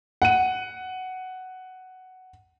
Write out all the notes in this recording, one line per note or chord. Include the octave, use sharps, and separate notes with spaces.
F#5 D#7